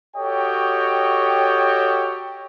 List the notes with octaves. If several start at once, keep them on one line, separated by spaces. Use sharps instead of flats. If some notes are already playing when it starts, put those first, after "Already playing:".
F#4 G4 A4 C#5 D#5 G5